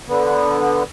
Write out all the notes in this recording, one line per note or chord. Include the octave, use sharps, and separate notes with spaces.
D3 B3